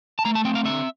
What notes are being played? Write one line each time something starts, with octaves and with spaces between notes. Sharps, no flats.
A5
A3 A#5
A5
C4 G5
F5
D3 E5